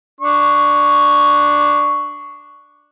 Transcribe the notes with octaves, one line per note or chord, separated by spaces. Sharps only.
D4 C#6